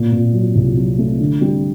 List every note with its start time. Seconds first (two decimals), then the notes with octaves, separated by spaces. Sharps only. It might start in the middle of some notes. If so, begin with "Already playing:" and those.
Already playing: A#2
0.12 A#2
0.34 F#3
0.55 C2
0.77 F#3
0.98 A3
1.20 D3
1.41 G3